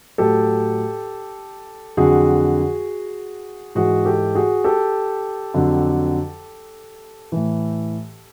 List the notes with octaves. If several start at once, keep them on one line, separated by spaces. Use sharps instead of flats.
A2 F#3 G4 A4
F2 D3 F#3 F#4 G#4
G#2 E3 F#4 G#4
G4 A4
F#4 G#4
G4 A4
F2 D3 F#3
A2 E3